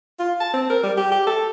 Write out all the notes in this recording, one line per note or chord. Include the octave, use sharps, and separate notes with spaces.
F4
A5
C4
A#4
G3
G4
G4
A4